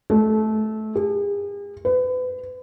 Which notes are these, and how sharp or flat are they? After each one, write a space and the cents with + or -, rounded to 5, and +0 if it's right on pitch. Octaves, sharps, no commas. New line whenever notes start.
A3 -20
G#4 -45
B4 +35